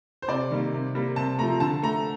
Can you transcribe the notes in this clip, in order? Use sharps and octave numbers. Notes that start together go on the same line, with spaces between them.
C5
C3 D5
D#3 G3 A#3
C3
G3 A#3
C3 A5
F3 A3 A#5
D3 A5
A3 A#5